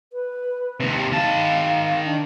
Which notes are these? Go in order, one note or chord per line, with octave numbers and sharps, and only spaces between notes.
B4
D#2 C3
D#3 F5 A5
D4